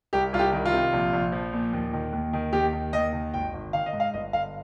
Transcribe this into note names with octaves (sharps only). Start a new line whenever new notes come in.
C2 G4
C2 F4
G4
D#3
F4
C3
A#1
A#1
F3
A#2
D#2
D#3
D#2
D#3
D#2 G4
D#3
D#2 D#5
D#3
G#1 G5
G#1
D#3 F5
D#5
G#2
F5
G1 D#5
G1 F5